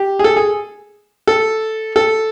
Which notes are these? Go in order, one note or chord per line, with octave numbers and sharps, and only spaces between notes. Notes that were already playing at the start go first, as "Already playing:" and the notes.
Already playing: G4
G#4
A4
G#4
A4
A4